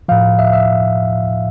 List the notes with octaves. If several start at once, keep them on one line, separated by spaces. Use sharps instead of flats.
A2 F3 F5
E5
F5
E5